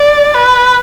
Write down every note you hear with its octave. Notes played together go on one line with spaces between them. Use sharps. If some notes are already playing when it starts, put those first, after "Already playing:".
Already playing: D5
B4